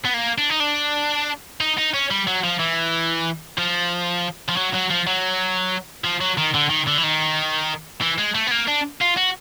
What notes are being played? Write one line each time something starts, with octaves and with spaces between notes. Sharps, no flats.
B3
A#3
D4
D#4
D4
D#4
D#4
C#4
G3
F#3
F3
E3
F3
F3
F#3
F#3
F3
F#3
F3
F#3
D#3
D3
D#3
D3
E3
D#3
E3
G#3
A3
B3
A#3
D4
F4
F#4